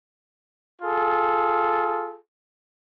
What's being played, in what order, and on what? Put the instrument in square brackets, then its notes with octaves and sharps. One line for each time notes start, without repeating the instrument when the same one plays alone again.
[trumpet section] F4 G#4 A4